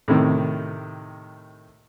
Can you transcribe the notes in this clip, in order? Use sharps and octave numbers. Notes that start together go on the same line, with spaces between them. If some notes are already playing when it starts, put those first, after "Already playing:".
A2 C3 D#3